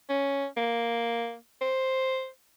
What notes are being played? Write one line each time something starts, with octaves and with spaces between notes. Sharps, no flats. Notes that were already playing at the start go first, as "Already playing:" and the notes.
C#4
A#3
C5